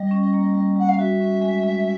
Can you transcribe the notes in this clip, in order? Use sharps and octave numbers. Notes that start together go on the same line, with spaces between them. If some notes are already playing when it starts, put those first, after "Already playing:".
Already playing: G3 D#5
C#4
A#3
G3
G3 F#5
F5
F#4 E5
C#4
G#3
G#3